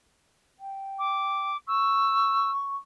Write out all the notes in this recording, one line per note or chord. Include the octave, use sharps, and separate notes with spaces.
G5
D6
C#6 E6